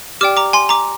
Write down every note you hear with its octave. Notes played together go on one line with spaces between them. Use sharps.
G4 D5 G5 D6 F6
A#5 D6
G#5 C6
A#5 D6